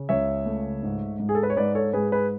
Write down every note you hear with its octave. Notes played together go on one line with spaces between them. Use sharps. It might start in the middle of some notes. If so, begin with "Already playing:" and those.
Already playing: C#3
C#2 C#5 E5
A3
G#2
G#2
G#4
A4
B4
C#5
G#2 B4 D5
A4 C#5
G#2 G#4 B4
G#4 B4